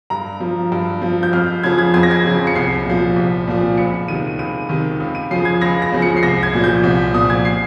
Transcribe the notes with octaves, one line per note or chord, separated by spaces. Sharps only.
G2 A#5
F3
G2
F3
G6
F2 F6
C#3 F3 G#6
G#6
F2 G#6
A#6
G#6
C#3 F3
C#7
C2 C7
A#2 F3
C2
A#2 F3
C#2 C#7
C3 D#3 D#7
C#2 D#7
C3 D#3
C#2
D#7
C#3 F3 C7
G#6
C#2 A#6
A#6
C#3 F3
C#7
C7
C2 A#6
G#6
A#2 F3
G6
C2
A#2 F3 D#6
G#6
C7